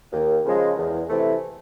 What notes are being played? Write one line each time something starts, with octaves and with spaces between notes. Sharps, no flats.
D#2
C#3 F3 G#3
E2
C3 E3 A3